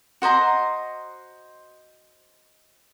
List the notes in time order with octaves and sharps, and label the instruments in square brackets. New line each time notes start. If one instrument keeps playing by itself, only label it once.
[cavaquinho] F#4 C5 D#5 A#5